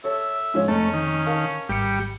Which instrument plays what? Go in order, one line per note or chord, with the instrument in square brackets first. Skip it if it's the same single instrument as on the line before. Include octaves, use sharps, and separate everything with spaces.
[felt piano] A4 C#5 [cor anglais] E5
[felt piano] G#2 F3 C#4
[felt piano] F1 [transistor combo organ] A3 [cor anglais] C#4
[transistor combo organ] D#3
[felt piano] A#4 F5 A5
[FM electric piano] G#1 C#7 [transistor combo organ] G3 [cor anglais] G4